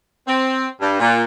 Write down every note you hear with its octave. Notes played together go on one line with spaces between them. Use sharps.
C4
G2
A#2